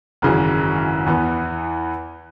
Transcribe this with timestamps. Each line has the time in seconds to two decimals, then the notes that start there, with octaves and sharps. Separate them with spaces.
0.22 G#1 F#2 C#3 E3
1.06 E2 E3 B3